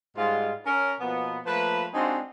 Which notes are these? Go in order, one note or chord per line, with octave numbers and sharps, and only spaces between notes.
G#2 G3 G#3 F4
C#4 A#4
B2 F3 A#3 B3
F3 A3 A#3 B4
G#3 C4 D4 D#4 F4 F#4